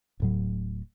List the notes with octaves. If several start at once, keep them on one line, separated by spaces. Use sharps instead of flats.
D1 A2 F#3